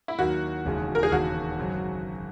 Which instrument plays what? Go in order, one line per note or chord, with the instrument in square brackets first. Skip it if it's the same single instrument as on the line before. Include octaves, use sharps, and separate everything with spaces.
[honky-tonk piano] E4
[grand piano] D#2 D#3 F#3 A#3 [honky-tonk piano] F#4
[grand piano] E1 D#2 C#3 G#3
[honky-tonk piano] A#4
G#4
[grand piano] E1 D#2 C#3 [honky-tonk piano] F#4
[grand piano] G#1 F#2 C#3 F#3